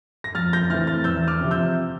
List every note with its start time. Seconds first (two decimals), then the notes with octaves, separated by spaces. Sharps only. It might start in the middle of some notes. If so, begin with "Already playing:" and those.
0.24 A#6
0.35 F2 F6 A6
0.53 G6 A#6
0.70 E3 A3 C4 F6 A6
0.87 F6 A6
1.04 E2 E6 G6
1.27 D6 F6
1.40 C3 F3 C4
1.51 E6 G6